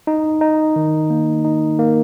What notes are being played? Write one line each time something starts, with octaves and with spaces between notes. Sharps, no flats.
D#4
D#4
D#3
A#3
D#4
A#3